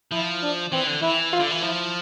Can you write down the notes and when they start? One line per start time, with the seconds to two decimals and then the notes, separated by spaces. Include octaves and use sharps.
0.11 F3 E4
0.42 D4
0.72 E3 C4
0.87 D3
1.02 E3 E4
1.33 F4
1.40 D3
1.51 E3
1.62 F3 E4